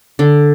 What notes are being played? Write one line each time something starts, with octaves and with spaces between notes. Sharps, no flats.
D3